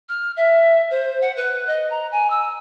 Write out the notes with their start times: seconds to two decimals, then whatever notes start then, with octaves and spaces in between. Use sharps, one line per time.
0.09 F6
0.37 E5
0.91 C5
1.22 F#5
1.37 B4
1.67 D#5
1.91 A#5
2.12 G#5
2.30 E6